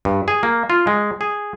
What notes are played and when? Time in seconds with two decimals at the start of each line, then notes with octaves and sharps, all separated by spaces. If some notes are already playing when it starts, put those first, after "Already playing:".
0.05 G2
0.28 G#4
0.43 A#3
0.70 F4
0.87 G#3
1.21 G#4